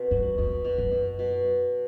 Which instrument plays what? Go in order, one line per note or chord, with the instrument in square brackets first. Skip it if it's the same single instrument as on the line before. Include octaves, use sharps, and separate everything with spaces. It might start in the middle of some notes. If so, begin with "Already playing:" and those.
Already playing: [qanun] B2 C4
[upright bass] F#2 [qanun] F#3
[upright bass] E2 [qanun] B2
[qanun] B2
[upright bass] F#2
[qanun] B2
B2